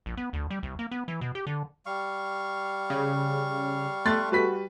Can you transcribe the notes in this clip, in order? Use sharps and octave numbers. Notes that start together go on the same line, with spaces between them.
A#1
B3
D2
G3
C2
A#3
B3
E3
B2
G4
D3
G3 F5 C#6
C#3
A3 C6 F#6 A6
G3 F#4 B4 B6